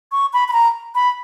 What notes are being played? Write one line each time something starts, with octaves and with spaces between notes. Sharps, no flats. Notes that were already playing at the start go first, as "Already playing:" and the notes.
C#6
B5
B5
A#5
B5